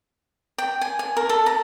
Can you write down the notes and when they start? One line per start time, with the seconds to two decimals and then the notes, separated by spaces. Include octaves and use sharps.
0.58 G5
0.81 G#5
0.99 G#5
1.17 A#4
1.29 A4
1.46 A#5